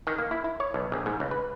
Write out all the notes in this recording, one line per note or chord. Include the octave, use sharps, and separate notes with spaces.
D#3
A#3
E4
E4
C#5
B1
A#1
G#2
C#2
B4